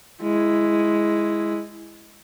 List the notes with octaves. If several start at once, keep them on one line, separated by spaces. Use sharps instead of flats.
G#3 E4